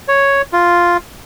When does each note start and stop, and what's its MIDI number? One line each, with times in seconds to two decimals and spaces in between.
0.08 0.42 73
0.53 0.97 65